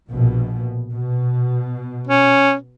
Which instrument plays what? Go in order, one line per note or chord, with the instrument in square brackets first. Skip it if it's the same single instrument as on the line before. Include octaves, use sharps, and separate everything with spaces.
[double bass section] A#1 B2
B2
[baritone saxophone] C#4